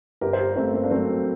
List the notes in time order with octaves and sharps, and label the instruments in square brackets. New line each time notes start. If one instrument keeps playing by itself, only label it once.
[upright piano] G1 G4 A#4
C5
G4 A#4
G1 A3 C4
A#3
D4
F#3 A3 C4